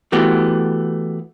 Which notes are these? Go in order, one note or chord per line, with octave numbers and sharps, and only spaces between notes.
E3 A3 B3 F#4 G4